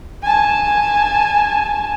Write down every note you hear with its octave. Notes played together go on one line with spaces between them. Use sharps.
G#5 A5